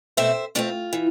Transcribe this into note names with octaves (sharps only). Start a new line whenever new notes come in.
B2 A3 C4 C5 E5
B2 A3 C4 D4 F4
E3